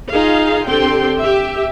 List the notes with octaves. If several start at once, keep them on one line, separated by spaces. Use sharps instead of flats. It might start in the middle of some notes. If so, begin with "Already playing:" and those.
D#4 F4 G#4 F5
D3 C4 G4 A4 G5 C6
G4 E5